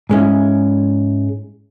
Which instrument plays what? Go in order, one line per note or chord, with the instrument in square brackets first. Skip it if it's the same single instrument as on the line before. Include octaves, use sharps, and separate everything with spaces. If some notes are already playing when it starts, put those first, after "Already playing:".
[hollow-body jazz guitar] G#2 G#3 C#4 E4